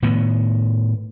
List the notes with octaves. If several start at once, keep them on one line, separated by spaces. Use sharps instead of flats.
A2 D#3 B3